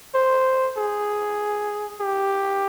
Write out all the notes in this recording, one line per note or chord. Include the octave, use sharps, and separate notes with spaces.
C5
G#4
G4